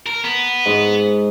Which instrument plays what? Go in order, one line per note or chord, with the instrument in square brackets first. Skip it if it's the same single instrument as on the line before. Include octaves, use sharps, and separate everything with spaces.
[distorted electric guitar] A#4
B3
[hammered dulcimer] G#2